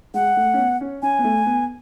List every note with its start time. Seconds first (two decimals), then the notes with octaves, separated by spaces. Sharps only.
0.14 G#3 F#5
0.37 A3
0.54 C#4
0.58 B3
0.81 C#4
1.02 C#4 G#5
1.19 B3
1.24 A3
1.46 B3